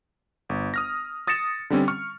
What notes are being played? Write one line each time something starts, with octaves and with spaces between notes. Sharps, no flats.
G1
D#6 F6 A#6
D#6 A6 A#6 C#7 E7
D3 G3 C4 C#4
C#6 F6